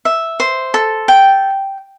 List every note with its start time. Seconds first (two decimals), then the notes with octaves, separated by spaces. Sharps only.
0.05 E5
0.40 C5
0.74 A4
1.08 G5